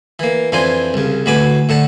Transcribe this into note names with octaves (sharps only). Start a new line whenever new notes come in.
E3 A#3
F2 E3 D4 F4 C5 G#5
C2 C#3
D2 A2 F#4 B4 G#5 D6
A2 D3 F#5 A5